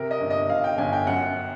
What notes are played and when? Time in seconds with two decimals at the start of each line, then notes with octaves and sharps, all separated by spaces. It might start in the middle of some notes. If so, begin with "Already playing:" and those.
Already playing: C3 A#4
0.11 D#5
0.21 G1
0.30 D#5
0.49 G1 F5
0.64 G5
0.78 G1 G#5
0.93 G5
1.07 F#2 F#5